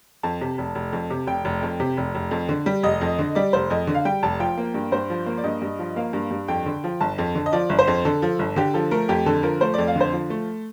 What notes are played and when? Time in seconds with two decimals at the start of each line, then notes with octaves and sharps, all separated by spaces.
0.23 F2 A5
0.41 C3
0.58 F1
0.75 F1
0.93 F2
1.10 C3
1.27 F1 G5
1.45 F1
1.62 F2
1.80 C3
1.97 F1
2.15 F1
2.31 F2
2.49 D3
2.66 G3
2.83 F1 D#5
3.01 F2
3.19 D3
3.35 G3 D5
3.53 F1 C5
3.70 F2 D#5
3.87 D3
3.94 F5
4.05 G3 G5
4.23 F1 A5
4.40 F3 G5
4.58 A#3
4.74 G2
4.92 G2 C5
5.10 F3
5.26 A#3
5.38 D5
5.44 G2 D#5
5.62 G2
5.79 F3
5.96 A#3 F5
6.13 G2
6.31 G2
6.48 F2 G5
6.66 D3
6.84 F3
7.00 G1 A5
7.18 F2
7.35 D3
7.46 D#5
7.53 F3 D5
7.69 G1
7.79 C5
7.87 F2
8.05 D3 A4
8.22 F3
8.39 G1
8.56 D3 G4
8.74 F3 A4
8.91 A3 A#4
9.09 F2 G4
9.26 D3 A4
9.43 F3 A#4
9.61 A3 C5
9.74 F2 D5
9.87 F5
9.96 D3 C5
10.13 F3
10.30 A3